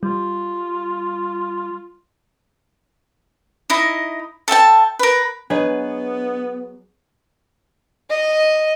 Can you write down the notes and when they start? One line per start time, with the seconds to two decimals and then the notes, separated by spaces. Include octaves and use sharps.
0.03 G3 F4
3.70 D#4 E4 D#5
4.48 A4 E5 G5 A5
4.99 A#4 B4
5.50 F#3 B3 D4 G#4 B4 C#5 D#5
8.10 D#5